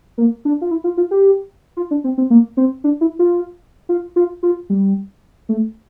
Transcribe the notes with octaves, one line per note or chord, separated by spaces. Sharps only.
A#3
D4
F4
E4
F4
F4
G4
F4
D4
C4
C4
A#3
C4
D4
E4
F4
F4
F4
F4
G3
A3